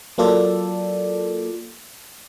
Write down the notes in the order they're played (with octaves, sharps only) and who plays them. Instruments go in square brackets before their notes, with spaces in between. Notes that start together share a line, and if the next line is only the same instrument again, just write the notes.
[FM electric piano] F#3 A#3 F4 A4 D5